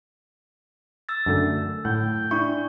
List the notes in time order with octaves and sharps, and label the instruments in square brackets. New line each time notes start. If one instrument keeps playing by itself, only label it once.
[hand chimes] E6 A6
[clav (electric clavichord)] F#2 D3 A3
[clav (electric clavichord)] A2 F#5 [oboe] G5
[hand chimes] D4 C#6 [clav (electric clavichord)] E4